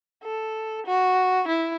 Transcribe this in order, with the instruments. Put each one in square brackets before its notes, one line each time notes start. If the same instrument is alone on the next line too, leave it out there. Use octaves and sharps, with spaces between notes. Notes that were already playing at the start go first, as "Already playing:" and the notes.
[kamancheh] A4
F#4
E4